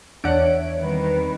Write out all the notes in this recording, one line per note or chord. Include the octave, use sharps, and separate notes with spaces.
E2 D4 C#5 E5 F#5 D7
D#3 G3 C4 B4